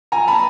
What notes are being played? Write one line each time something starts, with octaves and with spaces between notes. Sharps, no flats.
G#5 A#5
A5 B5